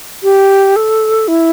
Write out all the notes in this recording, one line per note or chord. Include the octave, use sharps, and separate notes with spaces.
G4
A4
E4